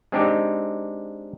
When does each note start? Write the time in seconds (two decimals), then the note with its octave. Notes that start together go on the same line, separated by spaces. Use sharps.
0.12 G#3 C4 D4 D#4 G4